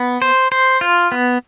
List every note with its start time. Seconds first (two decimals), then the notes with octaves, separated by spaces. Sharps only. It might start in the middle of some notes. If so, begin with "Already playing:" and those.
Already playing: B3
0.22 C5
0.52 C5
0.81 F4
1.12 B3